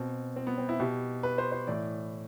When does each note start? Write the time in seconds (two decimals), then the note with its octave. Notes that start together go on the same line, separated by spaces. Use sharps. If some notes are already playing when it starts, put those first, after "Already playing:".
Already playing: B2 C4
0.36 C4
0.47 B3
0.58 C4
0.69 E4
0.80 B2 G4
1.23 B4
1.38 C5
1.52 C5
1.67 A2 E3 D5